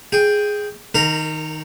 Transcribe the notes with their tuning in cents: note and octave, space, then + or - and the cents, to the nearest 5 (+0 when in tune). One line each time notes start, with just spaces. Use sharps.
G#4 +0 G5 +5
D#3 +0 A#4 -25 A#5 +0